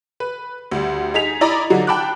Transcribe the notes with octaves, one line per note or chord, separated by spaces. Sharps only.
B4
D2 G3
D#4 G#4 B6 F7
E4 D5 D#5 A#5 B5
D3 F#3 D#4
G5 A5 B5 D6 F#6